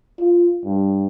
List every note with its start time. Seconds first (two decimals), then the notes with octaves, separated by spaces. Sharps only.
0.19 F4
0.65 G2